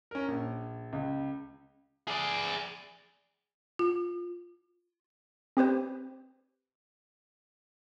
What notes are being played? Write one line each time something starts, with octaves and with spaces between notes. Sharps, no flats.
C#4 A#4
A#1
C#2
G#4 D5
F4
C4 G4 B4 C5